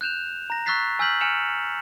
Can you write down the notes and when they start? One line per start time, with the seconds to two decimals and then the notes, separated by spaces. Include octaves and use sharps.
0.01 F#6 G6 E7 F7
0.50 A#5 A#6
0.66 C#6 E6 F#6 A6 B6 C7
0.99 G#5 E6 F6 G6 B6 F#7
1.21 G#5 F6 C#7 E7 F7